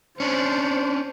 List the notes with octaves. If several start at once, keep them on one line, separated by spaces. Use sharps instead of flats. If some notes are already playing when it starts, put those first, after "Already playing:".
C#4 D4 C5